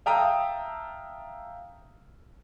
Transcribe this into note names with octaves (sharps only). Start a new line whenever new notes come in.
E5 F5 G5 A5 A#5 D#6